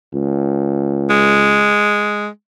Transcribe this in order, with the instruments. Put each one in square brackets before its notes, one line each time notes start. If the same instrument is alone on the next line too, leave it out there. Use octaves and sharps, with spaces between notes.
[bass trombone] C#2
[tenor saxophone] G#3